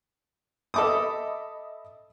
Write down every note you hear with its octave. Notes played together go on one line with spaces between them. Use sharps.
A4 D#5 E5 B5 D6 D#6